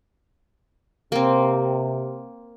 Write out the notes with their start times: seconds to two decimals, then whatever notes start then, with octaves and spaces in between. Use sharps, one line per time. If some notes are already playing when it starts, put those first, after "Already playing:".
1.12 C3 A#3 C4